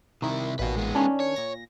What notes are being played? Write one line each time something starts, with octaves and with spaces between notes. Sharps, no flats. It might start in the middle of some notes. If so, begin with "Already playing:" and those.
C3 D#3 E4
A1 A#2 D#3 F#4 B4
G#3 B3
D#3 C#4 D4
C#5
A#2 A#6